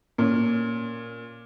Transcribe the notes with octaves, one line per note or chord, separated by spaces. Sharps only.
A#2 C#4